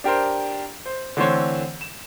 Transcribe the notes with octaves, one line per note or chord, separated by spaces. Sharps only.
D4 G4 A#4 C5
C5
D3 E3 A3 C4 C5 C#5
E7